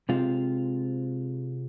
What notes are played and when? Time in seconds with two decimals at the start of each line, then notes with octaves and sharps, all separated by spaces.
0.09 C3 G#3 C4 F4